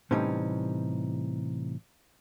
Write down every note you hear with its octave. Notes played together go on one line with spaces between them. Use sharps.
A2 C3 E3 G3 C#4 D#4